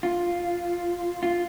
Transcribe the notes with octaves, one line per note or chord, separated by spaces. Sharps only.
F4
F4